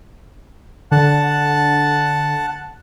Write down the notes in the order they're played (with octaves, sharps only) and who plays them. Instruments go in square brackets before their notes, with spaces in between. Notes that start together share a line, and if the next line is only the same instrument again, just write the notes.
[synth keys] D3 [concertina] F#5 A5